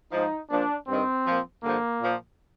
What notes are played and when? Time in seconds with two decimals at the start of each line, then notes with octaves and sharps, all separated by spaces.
0.12 G#2 F3 D#4
0.50 A#2 F3 D4
0.88 G2 D#3 C4
1.26 A#2 F3
1.63 G2 D3 F3 A#3
2.00 A#2 F3